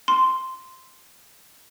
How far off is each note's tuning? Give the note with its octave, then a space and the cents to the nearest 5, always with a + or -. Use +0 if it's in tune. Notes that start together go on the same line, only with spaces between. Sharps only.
C6 -5